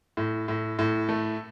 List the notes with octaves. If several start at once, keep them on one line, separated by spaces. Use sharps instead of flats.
A2
A2
A2
A3